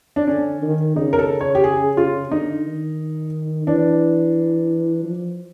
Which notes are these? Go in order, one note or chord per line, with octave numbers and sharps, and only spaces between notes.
D4
D3 C#4
D#3
C#3 D#4
A#4
A4
C#5
G4
G#4
F4
D3 D#4
D#3
E3 D4
F3